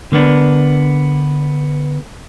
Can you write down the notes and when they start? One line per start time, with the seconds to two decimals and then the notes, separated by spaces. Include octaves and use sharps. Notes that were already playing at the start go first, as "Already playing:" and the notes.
0.12 D3 A#3 B3 D4